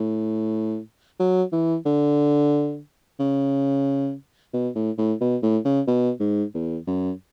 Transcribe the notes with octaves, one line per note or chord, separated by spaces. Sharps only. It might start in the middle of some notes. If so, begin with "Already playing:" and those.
Already playing: A2
F#3
E3
D3
C#3
B2
A2
A2
B2
A2
C#3
B2
G#2
E2
F#2